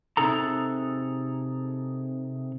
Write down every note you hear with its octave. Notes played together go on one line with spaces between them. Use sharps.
C3 G3 D#4 G#4 A4 A#5